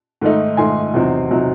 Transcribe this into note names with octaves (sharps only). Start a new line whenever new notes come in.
G#2 D#3 A3 D#4
G#2 D#3 A3 D#4 G#5 C6
E2 C3 F#3 C4 D#4
C3 F#3 C4 D#4